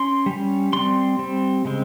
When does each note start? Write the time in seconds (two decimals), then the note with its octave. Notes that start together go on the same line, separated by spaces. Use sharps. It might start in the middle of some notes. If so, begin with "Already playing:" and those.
Already playing: C#4 C6
0.26 G3 C#4
0.73 G3 C4 C6
1.19 G3 C4
1.65 C#3 G#3 C4